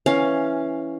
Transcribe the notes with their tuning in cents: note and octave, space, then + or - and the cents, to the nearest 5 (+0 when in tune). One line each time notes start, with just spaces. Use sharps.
E3 +0 C#4 +0 F5 +10